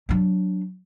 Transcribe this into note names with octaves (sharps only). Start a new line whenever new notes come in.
F#3 D4